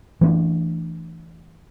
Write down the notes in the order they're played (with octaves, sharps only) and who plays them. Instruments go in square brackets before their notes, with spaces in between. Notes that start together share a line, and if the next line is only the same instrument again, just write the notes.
[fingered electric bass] E3 A3 D4